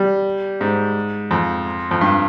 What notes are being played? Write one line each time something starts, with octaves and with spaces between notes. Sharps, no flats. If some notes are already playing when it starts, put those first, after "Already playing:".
Already playing: G3
G#2
F2
F2
G2